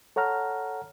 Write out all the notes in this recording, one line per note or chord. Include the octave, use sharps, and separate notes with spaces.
A4 C#5 F#5 A#5 F6